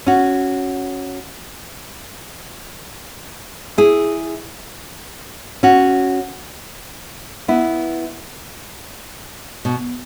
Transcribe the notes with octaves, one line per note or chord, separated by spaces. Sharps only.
C#4 F#4
E4 G#4
C#4 F#4
B3 E4
B2